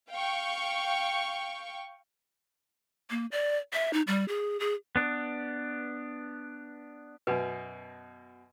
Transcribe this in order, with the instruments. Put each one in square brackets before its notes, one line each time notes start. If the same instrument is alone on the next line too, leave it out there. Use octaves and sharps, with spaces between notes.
[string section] F5 G5 C#6
[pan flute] A#3
D5
E5
D#4
G3
G#4
G#4
[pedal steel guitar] B3 D4
[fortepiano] F#2 B2 [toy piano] B4